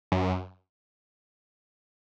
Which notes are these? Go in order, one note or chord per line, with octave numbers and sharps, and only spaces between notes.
F#2